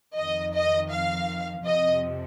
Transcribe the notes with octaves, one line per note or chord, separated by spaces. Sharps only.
F2 D#3 D#5
D#5
F5
F2 C3 F3 D#5